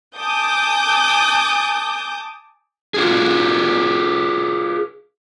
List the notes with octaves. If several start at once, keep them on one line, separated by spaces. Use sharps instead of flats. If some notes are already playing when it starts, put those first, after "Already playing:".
G#5 A5 D6 D#6 G6
F4 F#4 G#4